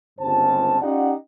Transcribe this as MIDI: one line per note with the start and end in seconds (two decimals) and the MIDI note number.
0.19 0.77 31
0.19 0.77 37
0.19 0.77 43
0.19 0.77 60
0.19 0.77 72
0.19 0.77 81
0.81 1.12 61
0.81 1.12 63
0.81 1.12 65
0.81 1.12 67
0.81 1.12 74
0.81 1.12 78